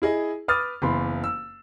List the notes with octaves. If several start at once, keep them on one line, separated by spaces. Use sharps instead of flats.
E4 G#4 D#5
B4 D6 D#6 F6 A6
F#1 E3 B3 B5 C6
E6